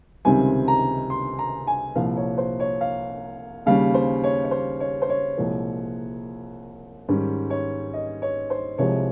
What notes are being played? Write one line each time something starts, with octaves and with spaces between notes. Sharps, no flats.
C#2 C3 D#3 G3 C4 G#5
A#5
C6
A#5
G#5
C2 A#2 F3 F5
C#5
C5
C#5
F5
D#2 C#3 G3 C#4 F5
C5
C#5
C#5
C5
C#5
C5
C#5
C2 A#2 F3 G#3
G#2 D#3 G3 C#4
C#5
D#5
C#5
C5
C2 C3 F3 G#3 C#5